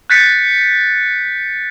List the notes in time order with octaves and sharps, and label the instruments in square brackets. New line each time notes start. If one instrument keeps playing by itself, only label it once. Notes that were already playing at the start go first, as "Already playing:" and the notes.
[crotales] F#6 G6 A6 B6 C#7